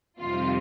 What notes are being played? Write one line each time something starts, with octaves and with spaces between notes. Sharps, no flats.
F2 C3 D#3 G3 F4